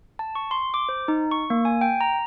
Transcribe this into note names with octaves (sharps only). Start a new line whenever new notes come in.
A5
C#6
C6
D6
C5
D#4
C#6
A#3
G#5
G5
A#5